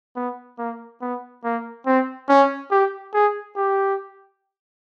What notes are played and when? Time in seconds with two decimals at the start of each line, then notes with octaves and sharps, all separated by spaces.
0.16 B3
0.58 A#3
1.01 B3
1.44 A#3
1.86 C4
2.29 C#4
2.71 G4
3.14 G#4
3.56 G4